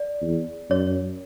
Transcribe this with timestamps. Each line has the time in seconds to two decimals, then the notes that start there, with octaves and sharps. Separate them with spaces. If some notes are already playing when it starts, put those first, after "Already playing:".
Already playing: D5
0.22 E2
0.70 F#2 C#5